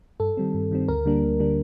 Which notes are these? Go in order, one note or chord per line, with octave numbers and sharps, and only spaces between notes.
G2 A4
D#3 G3 C4
G2
D#3 G3 C4
D2 A#4
D3 G3 A#3 D4
D2
D3 G3 A#3 D4